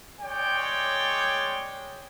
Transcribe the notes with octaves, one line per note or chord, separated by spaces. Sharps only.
G#3 C#5 D5 G5